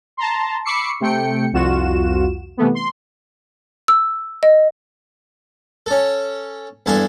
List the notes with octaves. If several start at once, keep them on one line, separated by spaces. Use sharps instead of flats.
A5 A#5 C6
B5 C#6 D6 E6 C7 C#7
C3 A3 G5 C#7
C2 F2 F4 F#4 E7
C3 E3 A3 B3
C6
E6
D#5
C#4 A4
E2 G2 A4 G#5 C6